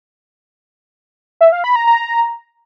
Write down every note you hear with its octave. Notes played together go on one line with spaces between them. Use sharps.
E5
F5
B5
A#5
A#5